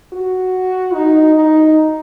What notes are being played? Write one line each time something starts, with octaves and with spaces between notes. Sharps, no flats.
F#4
D#4
D#4